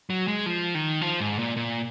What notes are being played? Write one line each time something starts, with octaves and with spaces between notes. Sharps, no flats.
F#3
G#3
F3
D#3
F3
G#2
A#2
A#2